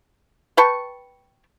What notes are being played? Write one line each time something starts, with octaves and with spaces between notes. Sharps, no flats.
B4 G5 A5 C#6